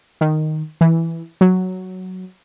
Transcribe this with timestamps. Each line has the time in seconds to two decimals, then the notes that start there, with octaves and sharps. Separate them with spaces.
0.21 D#3
0.81 E3
1.41 F#3